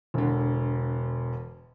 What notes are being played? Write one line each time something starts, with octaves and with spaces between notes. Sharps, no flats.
E1 D3